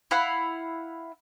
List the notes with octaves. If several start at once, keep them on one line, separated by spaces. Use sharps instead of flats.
E4 F5 F#5